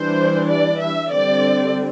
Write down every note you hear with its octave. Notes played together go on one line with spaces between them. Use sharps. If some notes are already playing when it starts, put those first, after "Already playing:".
Already playing: E3 G3 D4 C5
D5
E5
D3 G3 C4 D5